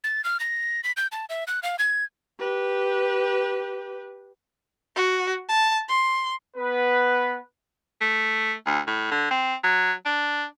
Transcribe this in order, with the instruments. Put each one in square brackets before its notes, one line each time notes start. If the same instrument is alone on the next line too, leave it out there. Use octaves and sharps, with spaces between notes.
[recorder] A6
F6
A#6
B6
G6
A5
E5
F#6
F5
G#6
[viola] G4 B4
[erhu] F#4
A5
C6
[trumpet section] B3 B4
[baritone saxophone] A3
D2
A2
D3
C4
F#3
D4